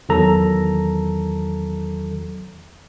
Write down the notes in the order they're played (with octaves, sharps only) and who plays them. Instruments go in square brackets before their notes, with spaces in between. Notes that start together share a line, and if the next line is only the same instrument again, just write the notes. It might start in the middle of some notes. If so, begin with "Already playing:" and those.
[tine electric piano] E2 D#3 F#3 A4 A#5